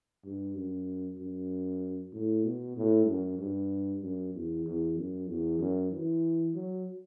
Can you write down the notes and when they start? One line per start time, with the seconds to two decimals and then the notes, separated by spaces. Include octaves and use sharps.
0.24 G2
0.55 F#2
1.18 F#2
2.13 A2
2.45 B2
2.77 A2
3.07 F#2
3.39 G2
4.02 F#2
4.34 E2
4.66 E2
4.97 F#2
5.28 E2
5.60 F#2
5.92 E3
6.55 F#3